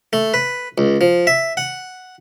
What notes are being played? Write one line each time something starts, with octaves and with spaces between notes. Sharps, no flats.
A3
B4
C#2
F3
E5
F#5